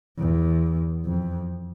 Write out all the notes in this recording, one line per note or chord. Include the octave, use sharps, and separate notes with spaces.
E2
F2